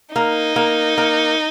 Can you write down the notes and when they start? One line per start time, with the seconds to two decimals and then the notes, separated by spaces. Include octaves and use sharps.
0.15 A#3 D#4
0.56 A#3
0.98 A#3